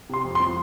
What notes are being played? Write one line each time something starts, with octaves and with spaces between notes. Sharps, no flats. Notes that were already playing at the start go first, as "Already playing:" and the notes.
C3 C6
F2
C6
F3